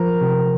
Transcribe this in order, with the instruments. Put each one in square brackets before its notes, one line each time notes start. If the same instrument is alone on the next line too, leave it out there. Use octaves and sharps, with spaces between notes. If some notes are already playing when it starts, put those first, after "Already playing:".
Already playing: [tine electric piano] F3 [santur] A#4
[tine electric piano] C3